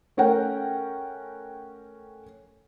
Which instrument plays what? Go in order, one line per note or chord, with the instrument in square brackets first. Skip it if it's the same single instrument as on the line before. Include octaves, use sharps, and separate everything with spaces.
[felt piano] A3 C#4 A#4 F#5 G5